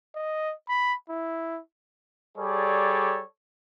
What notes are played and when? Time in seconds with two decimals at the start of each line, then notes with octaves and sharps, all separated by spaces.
0.15 D#5
0.68 B5
1.10 E4
2.37 G3 G#4 A4 C#5 D5